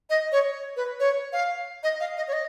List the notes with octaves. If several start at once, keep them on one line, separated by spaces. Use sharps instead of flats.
D#5
C#5
B4
C#5
F5
D#5
F5
D#5
C#5
D#5